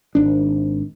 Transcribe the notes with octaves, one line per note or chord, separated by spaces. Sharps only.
G#1 D4